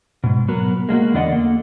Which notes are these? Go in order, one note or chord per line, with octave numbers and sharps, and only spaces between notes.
G#2 B2
B2 F#3 B3 F#4 A#4 B4
G#3 A#3 D4 F#4
E2 D3 B3 D5 D#5 F#5
A#3 A4